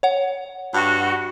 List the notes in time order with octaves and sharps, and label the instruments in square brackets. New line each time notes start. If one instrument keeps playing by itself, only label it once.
[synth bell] C#5 F#5
[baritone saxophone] G2 [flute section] F#4